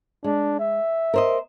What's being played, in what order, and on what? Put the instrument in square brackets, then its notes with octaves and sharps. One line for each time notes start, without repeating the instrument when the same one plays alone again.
[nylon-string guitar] G#3 [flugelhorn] D4
[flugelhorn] E5
[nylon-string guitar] A#4 C5 D#5